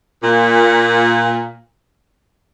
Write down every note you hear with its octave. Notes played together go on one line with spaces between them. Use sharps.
A#2